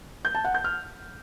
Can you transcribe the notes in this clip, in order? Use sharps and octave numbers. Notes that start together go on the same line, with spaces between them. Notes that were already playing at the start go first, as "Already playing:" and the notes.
G6
A5
F#5
G6
F6